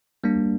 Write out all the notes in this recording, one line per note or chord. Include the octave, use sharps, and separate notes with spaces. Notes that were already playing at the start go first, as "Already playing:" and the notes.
G3 A#3 D4